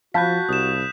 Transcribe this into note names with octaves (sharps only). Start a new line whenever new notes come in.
F3 F#4 F5 A5 B5 F#6 G6 B6
C2 D#6 E7